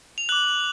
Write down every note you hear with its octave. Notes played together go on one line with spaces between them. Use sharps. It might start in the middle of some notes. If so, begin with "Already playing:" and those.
F7
D6 F#6 F#7